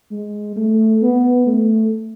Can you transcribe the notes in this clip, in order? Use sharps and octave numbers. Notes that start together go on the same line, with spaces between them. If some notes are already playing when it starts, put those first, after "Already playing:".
G#3
A3
B3
A3